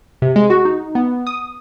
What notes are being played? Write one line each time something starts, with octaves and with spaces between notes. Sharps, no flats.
C3
G#3
F#4
D#4
B3
D#6